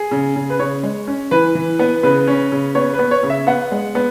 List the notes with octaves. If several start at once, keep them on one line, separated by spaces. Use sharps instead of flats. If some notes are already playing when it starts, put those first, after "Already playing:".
Already playing: G#4
C#3
C#3
B4
C#3 C#5
G#3
C#4
E3 B4
E3
B3
C#3 B4
C#4
C#3
B3 C#5
B4
B3
C#5
C#3
E5
B3 F#5
G#3
B3